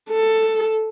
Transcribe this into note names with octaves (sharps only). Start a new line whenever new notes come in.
A4